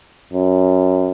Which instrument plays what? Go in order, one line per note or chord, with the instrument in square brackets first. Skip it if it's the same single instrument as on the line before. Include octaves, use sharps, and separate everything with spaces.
[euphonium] F#2